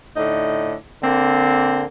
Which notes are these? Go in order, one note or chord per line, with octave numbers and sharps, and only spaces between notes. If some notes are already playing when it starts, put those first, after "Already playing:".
A2 D3 D#4
D3 A#3 C4